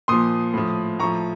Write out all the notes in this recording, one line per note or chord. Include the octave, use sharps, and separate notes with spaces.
A#2 F3 C6 D#6
A2 F3
A2 F3 A#5 C#6